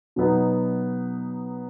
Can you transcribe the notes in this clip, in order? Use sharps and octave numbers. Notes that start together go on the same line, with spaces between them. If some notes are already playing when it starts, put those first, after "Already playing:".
B2 F#3 B3 D#4